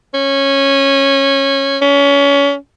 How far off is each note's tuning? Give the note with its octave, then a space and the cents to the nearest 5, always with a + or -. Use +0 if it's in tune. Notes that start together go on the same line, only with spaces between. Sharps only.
C#4 -15
C#4 +25